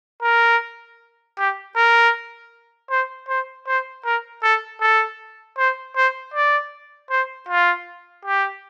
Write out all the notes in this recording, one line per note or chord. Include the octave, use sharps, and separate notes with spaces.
A#4
G4
A#4
C5
C5
C5
A#4
A4
A4
C5
C5
D5
C5
F4
G4